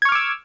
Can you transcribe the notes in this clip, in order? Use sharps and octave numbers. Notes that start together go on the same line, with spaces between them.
C#6 D6 E6 F6 G#6